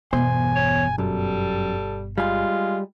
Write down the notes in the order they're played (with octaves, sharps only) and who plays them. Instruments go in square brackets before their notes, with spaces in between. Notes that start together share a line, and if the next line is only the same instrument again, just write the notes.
[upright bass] G1 B2 [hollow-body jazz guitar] E2 C5 [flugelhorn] G#5
[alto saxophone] C#5
[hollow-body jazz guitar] F#2 [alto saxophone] G3 [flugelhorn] A4
[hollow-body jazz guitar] G3 G#5 [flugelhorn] G#3 [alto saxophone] F4